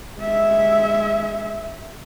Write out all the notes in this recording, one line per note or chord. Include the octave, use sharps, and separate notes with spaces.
G#3 E5